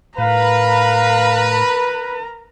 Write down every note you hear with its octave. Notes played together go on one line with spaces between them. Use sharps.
A2 A#4 B4 F5 A#5